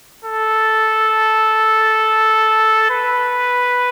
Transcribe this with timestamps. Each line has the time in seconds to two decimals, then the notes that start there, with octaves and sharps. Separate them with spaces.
0.25 A4
2.91 B4